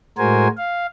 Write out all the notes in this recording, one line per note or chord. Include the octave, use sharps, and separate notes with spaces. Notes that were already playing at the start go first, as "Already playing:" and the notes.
A2 G#3 F#4 A#4 C5 G#5
F5